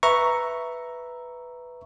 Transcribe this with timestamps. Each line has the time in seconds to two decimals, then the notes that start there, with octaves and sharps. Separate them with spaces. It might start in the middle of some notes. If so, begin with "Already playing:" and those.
0.03 B4 E5 A#5 C#6